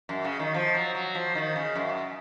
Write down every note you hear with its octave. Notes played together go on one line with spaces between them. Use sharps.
F#2
C#3
D#3
F3
F#3
F#3
F3
D#3
C#3
F#2